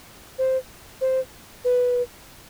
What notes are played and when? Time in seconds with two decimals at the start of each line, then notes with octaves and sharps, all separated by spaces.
0.38 C5
1.01 C5
1.65 B4